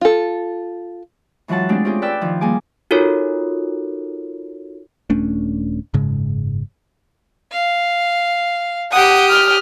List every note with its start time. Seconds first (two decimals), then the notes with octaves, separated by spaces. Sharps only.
0.01 F4 A4
1.48 G#2 E3 F#3 F4 F#5 A5
1.69 G#3 A3 C4 D4 F4 G4
1.85 C4 C#4 F4 G4 G#4
2.02 B4 D5 G5 D6 E6
2.21 D#3 F3
2.41 G3 A#3 G#4 G#5 D6
2.91 D#4 F4 F#4 A4 A#4 C#5
5.10 D#1 A3 C#4 D4
5.94 F#1 G#2 C#3 G#3
7.52 F5
8.92 G4 F#5 D#6
9.30 F6